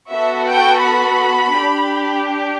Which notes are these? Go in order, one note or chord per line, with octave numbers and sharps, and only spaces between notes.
B3 F#4 A4 E5
G5
B5
D4 G4